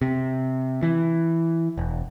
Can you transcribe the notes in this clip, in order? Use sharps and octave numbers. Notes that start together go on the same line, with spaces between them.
C3
E3
E1